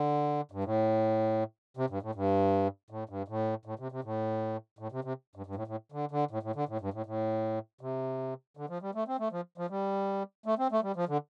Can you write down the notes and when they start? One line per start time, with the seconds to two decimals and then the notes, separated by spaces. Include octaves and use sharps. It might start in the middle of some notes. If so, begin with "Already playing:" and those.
Already playing: D3
0.52 G2
0.64 A2
1.77 C3
1.90 G2
2.02 A2
2.15 G2
2.90 A2
3.09 G2
3.28 A2
3.65 A2
3.79 C3
3.92 C3
4.04 A2
4.79 A2
4.92 C3
5.04 C3
5.36 G2
5.46 G2
5.56 A2
5.67 A2
5.92 D3
6.11 D3
6.31 A2
6.43 A2
6.56 D3
6.69 A2
6.81 G2
6.93 A2
7.06 A2
7.81 C3
8.57 D3
8.69 F3
8.82 G3
8.95 A3
9.08 C4
9.20 A3
9.32 F3
9.58 F3
9.70 G3
10.46 A3
10.59 C4
10.72 A3
10.83 G3
10.96 F3
11.09 D3